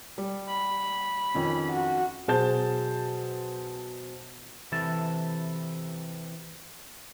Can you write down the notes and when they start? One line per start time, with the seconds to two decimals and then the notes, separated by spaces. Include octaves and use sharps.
0.18 G3
0.48 B5
1.34 F2 D#3 C#4
1.71 F#4
2.28 B2 F#3 G#4 C5 A5 G6
4.72 C3 E3 E4 A4 A5